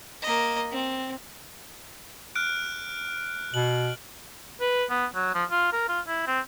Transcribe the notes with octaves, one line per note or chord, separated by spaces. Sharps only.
A#3 D#5
C4
F6 F#6 D7
B2 F#7
B4
B3
F#3
F3
F4
A#4
F4
E4
C4